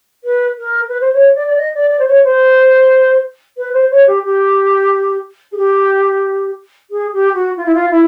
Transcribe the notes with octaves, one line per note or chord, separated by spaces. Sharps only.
B4
A#4
B4
C5
C#5
D5
D5
D#5
D5
D5
C5
C#5
C5
B4
C5
C#5
G4
G4
G#4
G4
G#4
G4
F#4
F4
E4
F4
E4